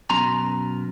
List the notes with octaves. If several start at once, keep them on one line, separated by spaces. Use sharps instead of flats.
F#2 B2 A#5 C6